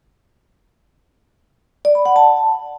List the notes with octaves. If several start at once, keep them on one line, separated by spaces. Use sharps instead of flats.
D5
B5
F#5
A5